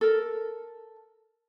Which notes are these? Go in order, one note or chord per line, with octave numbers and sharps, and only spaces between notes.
A4 A#4